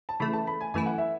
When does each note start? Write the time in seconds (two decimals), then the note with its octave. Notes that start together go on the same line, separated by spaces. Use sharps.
0.09 A5
0.20 C#3 E3 A3 B5
0.33 A5
0.47 B5
0.61 G#5
0.74 F#2 E3 A3 E4 G#5
0.86 F#5
0.98 E5